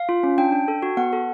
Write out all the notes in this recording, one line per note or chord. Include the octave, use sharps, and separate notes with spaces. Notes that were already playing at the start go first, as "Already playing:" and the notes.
Already playing: F5
F4
C#4
D4 G5
D4
A4
F#4
B3 F#5
A4